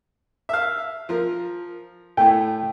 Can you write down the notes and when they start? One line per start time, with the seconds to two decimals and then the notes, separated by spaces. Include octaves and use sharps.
0.49 E5 F5
1.09 F3 A#4
2.17 A2 A3 G5